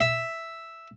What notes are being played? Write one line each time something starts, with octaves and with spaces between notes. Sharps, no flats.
E5